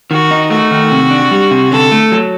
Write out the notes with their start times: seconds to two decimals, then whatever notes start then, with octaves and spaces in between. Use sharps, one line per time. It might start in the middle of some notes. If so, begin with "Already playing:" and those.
0.11 D#3 F#4
0.31 D#4
0.50 A3 F#4
0.71 D#3
0.91 C3
1.11 D4
1.31 G3
1.51 C3
1.71 D3 A4
1.92 A3
2.12 F#3